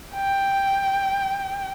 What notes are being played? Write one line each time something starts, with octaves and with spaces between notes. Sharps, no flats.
G5